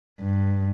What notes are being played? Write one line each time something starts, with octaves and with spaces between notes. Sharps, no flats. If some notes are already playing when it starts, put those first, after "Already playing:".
G2